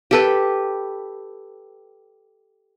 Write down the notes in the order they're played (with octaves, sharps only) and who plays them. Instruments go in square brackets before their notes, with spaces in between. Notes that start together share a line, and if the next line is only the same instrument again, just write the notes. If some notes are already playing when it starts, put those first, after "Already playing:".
[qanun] G4 A4 B4